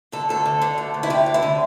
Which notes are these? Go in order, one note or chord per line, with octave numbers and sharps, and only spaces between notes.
D3 A4
D2 A4
D3
D3
D2
D2
E4
D3 G4
D2
E4
D3